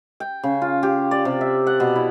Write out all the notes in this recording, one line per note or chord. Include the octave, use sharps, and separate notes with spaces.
G5
C#3
F4
G4
D5
C3
E5
F#5
B2
E4